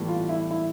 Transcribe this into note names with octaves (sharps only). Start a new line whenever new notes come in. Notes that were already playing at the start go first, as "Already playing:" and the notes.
Already playing: A2 E3 G3 B3
F4
E4
E4